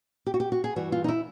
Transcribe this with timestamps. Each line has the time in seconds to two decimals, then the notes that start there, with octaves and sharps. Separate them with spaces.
0.26 G4
0.34 F#4
0.40 G4
0.52 F#4
0.64 G#4
0.76 G2 E3 G3 F#4
0.92 F4
1.04 D#4
1.08 E4